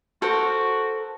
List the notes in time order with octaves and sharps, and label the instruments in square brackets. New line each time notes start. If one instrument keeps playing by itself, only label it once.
[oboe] F#4 [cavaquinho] A4 A#4 C5